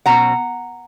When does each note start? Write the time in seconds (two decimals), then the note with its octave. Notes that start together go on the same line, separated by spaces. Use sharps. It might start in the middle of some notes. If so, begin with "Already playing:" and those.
0.06 B2 F#3 C#4 F#5 A#5